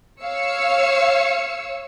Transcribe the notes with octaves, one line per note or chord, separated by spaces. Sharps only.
C#5 F5 E6 C#7